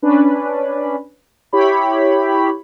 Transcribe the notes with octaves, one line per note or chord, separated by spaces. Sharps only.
C#4 D4 B4
E4 G4 C#5 B5